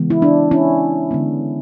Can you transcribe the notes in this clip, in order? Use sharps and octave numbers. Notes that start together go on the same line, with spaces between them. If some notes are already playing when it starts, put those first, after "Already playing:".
Already playing: C#3 E3 G#3 B3
E4
D4
C#4 E4
D3 G#3 B3